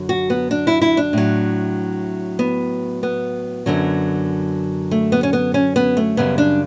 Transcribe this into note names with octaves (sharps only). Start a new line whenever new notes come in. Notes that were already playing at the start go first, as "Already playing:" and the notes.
Already playing: F#2 D3 F#3
F#4
B3
D4
E4
E4
D4
A2 F#3
B3
B3
F#2 D3 F#3
A3
B3
C#4
B3
C#4
B3
A3
F#2 C#3 G3 B3
D4